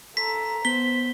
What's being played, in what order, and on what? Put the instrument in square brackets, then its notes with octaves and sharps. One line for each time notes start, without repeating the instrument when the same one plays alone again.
[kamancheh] A4 A#5 [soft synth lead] C6 [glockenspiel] B6
[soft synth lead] B3 [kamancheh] C5 [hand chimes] B6 [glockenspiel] G7